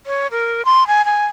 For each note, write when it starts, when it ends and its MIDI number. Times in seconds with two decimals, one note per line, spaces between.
0.06 0.27 73
0.31 0.65 70
0.65 0.87 84
0.87 1.05 80
1.05 1.25 80